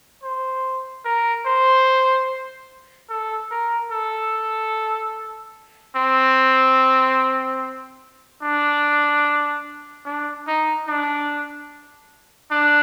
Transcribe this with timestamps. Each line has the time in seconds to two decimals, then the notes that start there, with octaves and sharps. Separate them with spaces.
0.23 C5
1.05 A#4
1.46 C5
3.10 A4
3.51 A#4
3.92 A4
5.96 C4
8.43 D4
10.05 D4
10.47 D#4
10.88 D4
12.51 D4